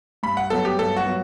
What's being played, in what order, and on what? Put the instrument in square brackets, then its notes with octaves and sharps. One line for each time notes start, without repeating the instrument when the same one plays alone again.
[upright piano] G2 [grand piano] B5
[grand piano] F#5
[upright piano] F#3 B3 [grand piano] A4
[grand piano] G4
[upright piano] G2 [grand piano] A4
[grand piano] F#4
[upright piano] F#3 B3